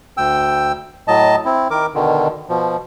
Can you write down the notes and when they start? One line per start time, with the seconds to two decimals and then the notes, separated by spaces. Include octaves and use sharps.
0.17 D2 G5 E6
1.08 A2 F#3 D#5 A5
1.45 C4 E4
1.71 D#3 A#4 D6
1.95 B2 D3 D#3
2.49 B2 F3